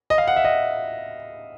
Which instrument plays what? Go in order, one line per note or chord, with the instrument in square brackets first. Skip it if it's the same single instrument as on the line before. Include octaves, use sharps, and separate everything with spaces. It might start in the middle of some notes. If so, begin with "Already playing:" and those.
[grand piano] D#5
F5
F#5
E5
D#5